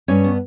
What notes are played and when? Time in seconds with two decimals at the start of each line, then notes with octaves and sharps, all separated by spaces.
0.08 G2 C#4 C#5
0.24 B3